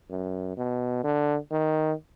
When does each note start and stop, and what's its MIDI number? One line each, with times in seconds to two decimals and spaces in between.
0.10 0.57 42
0.57 1.01 47
1.04 1.36 50
1.52 1.92 51